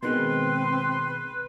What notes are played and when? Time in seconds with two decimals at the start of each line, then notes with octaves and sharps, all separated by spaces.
0.03 B2 D#3 G#3 C4 B4 C6